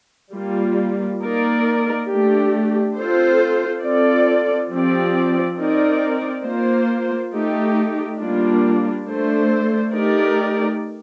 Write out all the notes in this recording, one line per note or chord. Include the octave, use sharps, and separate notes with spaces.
G3 A#3 F4
A#3 D#4 A#4 D5
A3 D4 G4
C4 F4 A4 C5
C4 F4 A4 D5
F3 C4 G4 D5
C4 D#4 A#4 D5
A#3 F4 C5
A3 D#4 G4
G3 A#3 D4 F4
A3 D4 A4 C5
A3 D#4 G4 A#4 D5